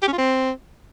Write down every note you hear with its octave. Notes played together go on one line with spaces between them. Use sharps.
G4
C#4
F4
C4